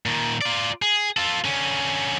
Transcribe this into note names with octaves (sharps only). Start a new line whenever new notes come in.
A#2 D#3
F4 D5
G#4
F4 A4
D3 C#4